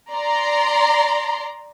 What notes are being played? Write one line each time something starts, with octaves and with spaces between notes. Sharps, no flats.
D5 A#5 C6